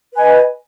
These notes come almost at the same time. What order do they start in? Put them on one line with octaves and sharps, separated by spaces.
B4 G#5 D#5